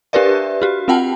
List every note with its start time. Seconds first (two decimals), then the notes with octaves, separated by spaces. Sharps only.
0.13 D4 G4 A#4 B4 D5 E5
0.62 F#4 G4
0.88 C4 F4 F#5 G5 A5